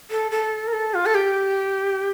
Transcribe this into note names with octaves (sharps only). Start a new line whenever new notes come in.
A4
A4
A#4
A4
F4
A4
G4